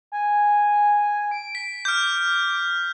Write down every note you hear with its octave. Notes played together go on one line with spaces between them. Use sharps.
G#5
D7
B6
D6 F6 G6